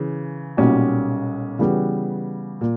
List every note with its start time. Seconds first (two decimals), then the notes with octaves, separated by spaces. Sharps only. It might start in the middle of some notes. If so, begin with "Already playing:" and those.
Already playing: C#3 E3
0.57 B1 A#2 G3 C#4 F#4
1.59 C#3 E3 G3 B3 F#4
2.61 A#2